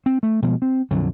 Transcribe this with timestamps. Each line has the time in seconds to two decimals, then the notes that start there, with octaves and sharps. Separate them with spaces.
0.06 C4
0.23 A3
0.42 B2 F3 G3 G#3
0.62 C4
0.91 A#1 F2 D3 F#3